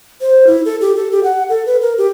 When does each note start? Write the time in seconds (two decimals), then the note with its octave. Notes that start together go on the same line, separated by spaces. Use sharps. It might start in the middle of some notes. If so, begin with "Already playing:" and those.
0.21 C5
0.47 E4
0.65 A4
0.81 G4
0.96 A4
1.11 G4
1.24 F#5
1.49 A4
1.66 B4
1.81 A#4
1.98 G4